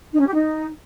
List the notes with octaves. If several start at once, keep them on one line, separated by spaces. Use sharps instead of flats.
D#4
C#4
G4
D#4